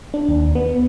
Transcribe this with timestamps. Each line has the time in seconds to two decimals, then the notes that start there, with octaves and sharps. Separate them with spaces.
0.14 D4
0.29 D#2
0.55 B3